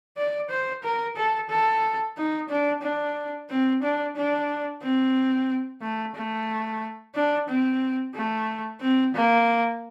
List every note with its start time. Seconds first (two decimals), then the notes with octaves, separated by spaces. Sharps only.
0.17 D5
0.50 C5
0.83 A#4
1.16 A4
1.50 A4
2.17 D#4
2.49 D4
2.82 D4
3.50 C4
3.83 D4
4.16 D4
4.82 C4
5.82 A3
6.15 A3
7.15 D4
7.49 C4
8.15 A3
8.81 C4
9.14 A#3